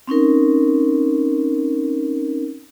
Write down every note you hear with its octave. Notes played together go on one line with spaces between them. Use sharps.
C4 C#4 D#4 A#4